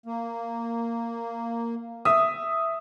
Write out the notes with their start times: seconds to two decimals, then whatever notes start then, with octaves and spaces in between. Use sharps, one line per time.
0.06 A#3
2.05 E5 D#6